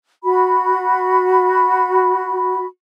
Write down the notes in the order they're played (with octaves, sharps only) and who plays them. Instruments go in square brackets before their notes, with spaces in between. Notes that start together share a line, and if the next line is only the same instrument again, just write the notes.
[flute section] F#4 B5